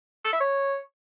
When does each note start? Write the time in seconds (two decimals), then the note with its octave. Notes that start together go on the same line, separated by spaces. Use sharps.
0.25 A4
0.33 E5
0.41 C#5